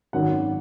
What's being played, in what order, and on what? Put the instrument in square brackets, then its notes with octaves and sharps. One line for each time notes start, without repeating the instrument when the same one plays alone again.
[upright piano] G#1 F#2 D#3 F#3 F#5